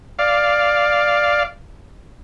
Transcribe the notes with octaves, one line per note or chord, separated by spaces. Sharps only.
D5 F5